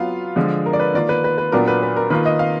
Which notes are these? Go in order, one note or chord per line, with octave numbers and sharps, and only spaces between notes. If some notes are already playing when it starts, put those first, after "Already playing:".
Already playing: F#3 B3 F4 F5
D3 F3 G#3
A#4
D5
B4
D#3 A#3 F4 D5
B4
B4
B4
A#2 F#3 B3 D4 F4 A#4
B4
B4
A#4
D#3 A#3 F4 B4
D#5
F5